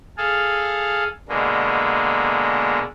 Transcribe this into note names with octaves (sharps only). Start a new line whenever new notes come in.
G#4 A4 F5
B2 D3 G#3 A#3